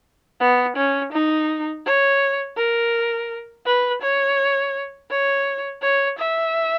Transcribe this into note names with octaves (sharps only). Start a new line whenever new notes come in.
B3
C#4
D#4
C#5
A#4
B4
C#5
C#5
C#5
E5